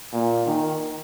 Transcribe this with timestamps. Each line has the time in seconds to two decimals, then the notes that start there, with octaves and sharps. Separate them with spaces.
0.13 A#2
0.46 D#3